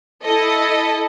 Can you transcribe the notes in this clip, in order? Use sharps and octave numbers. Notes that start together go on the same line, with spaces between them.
E4 A4 D#5